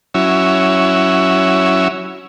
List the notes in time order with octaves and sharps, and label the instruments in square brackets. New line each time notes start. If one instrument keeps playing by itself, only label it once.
[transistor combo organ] F#3 C#4 E4